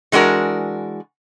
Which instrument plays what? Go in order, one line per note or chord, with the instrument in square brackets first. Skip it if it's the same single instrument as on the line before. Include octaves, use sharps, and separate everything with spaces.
[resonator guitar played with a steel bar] E3 G#3 D4 F#4 A#4